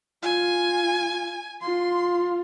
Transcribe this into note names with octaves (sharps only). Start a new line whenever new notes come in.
F4 G#5
F4 C6